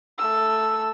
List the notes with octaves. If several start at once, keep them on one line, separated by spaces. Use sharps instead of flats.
A3 E6